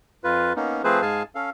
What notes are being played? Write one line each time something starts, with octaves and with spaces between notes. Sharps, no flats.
F2 F4 B4
A#3 B3 C#4 D#4
F3 A3 C4 G#4 B4 C5
G#2 G#3 G#4 F5 G#5 A5
C#4 A4 F5